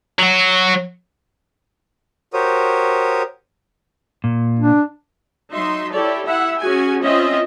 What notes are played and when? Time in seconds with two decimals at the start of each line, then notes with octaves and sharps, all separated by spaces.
0.19 F#3 F#4
2.33 F#4 G4 A#4 C5 C#5 D#6
4.24 A#2
4.59 D4
5.51 F#3 D#4 E5 C6
5.93 E4 G4 A4 C#5 D5
6.26 E4 E5 F#5
6.61 C#4 F#4 G#4 G#5
7.02 C4 C#4 F4 D#5 E5